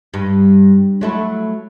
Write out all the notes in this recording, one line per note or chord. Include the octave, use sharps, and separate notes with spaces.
G2
F#3 A3 E4